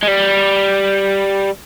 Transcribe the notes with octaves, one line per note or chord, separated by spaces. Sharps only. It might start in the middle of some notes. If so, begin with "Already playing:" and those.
G#3
G3